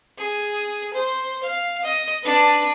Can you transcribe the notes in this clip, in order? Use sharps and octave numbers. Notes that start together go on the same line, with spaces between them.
G#4
C5
F5
D#5
D4 B4